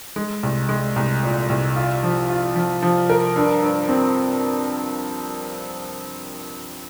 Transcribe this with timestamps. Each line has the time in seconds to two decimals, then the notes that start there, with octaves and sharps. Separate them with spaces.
0.16 G#3
0.43 C2
0.69 G#3
0.96 C2
1.23 A#2
1.49 C2
1.76 F4
2.03 F3
2.30 F4
2.56 F3
2.82 F3
3.10 A#4
3.36 G2
3.62 G2
3.89 C4